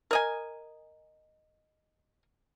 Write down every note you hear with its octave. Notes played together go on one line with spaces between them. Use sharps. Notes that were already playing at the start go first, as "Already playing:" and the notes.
A#4 D#5 G#5